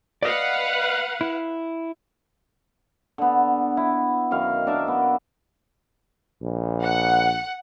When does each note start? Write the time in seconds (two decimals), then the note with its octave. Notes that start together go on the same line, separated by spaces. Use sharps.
0.23 B4 D5 D#5 F5 F#5
1.21 E4
3.18 D3 B3
3.77 E4
4.31 F#2 D#3 F5
4.67 D4 A#4 D5 E5
4.88 B3
6.43 A#1
6.84 F#5